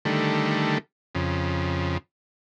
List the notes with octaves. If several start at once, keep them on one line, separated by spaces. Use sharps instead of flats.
D3 D#3 G3 A3
F2 C#3